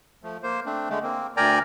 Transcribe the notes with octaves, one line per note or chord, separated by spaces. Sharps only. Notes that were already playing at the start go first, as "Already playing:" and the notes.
F3 A3
A#3 C5
A3 C4 D4
D3 G#3 A3
A#3 C4
D2 A#4 D5 G5 G#5 A#5